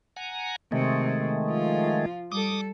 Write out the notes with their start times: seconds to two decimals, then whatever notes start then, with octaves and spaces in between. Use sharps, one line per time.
0.16 F#5 G#5 A#5
0.72 C3 D#3 G#3 A3
1.47 F3 F4
2.32 G3 A4 D6 D#6